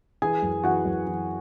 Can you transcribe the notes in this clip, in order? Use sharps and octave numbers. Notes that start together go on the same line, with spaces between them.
E3 G#4 G#5
F#2
E3 F#4 F#5
F#2
E3